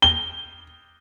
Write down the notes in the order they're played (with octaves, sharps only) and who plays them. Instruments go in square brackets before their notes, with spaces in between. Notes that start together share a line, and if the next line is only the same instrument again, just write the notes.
[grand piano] G7